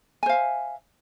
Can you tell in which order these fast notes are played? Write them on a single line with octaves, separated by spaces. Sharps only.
G#5 C5 F5 E5